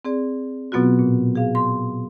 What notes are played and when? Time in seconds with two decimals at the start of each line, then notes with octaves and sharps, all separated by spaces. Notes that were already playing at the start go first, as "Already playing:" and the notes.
0.05 C4 G#4 D5
0.72 B2 F#3 B3 C4 F4 F#4
0.99 A#2
1.36 G#4 F5
1.55 C6